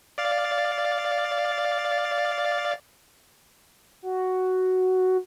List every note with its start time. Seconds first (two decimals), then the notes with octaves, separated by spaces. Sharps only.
0.18 D5 F5 A6
4.02 F#4